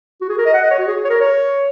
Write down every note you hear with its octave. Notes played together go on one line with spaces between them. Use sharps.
F#4
G#4
A#4
D#5
F#5
D#5
C#5
F#4
G#4
C#5
A#4
C#5